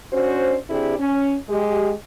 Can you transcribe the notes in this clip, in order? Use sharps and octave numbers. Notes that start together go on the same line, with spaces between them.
C#4 D4 F#4 C5
C3 D4 E4 G4 G#4
C#4
G#3 G4